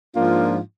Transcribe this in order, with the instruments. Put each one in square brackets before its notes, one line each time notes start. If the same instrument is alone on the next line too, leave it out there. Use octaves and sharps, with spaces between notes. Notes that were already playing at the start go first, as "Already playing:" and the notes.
[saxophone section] G#2 F3 A#3 D4 F4